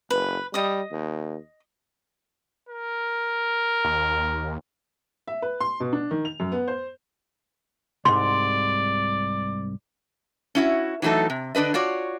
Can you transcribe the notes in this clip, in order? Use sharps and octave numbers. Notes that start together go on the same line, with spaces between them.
F#1 B4
G3 D#5 D#6
D#2
A#4
D#2
E5
B4
C6
B2
D4
D#3
F7
F#2
B3
C5
C2 G#2 D5 C6
C#4 E4 F#4
E3 F#3 A3 D#4 A4
C3
D3 D4 B4 D#5
F4 F#4 C#5 D5